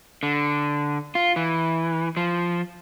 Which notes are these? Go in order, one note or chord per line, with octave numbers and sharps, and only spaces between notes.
D3
F4
E3
F3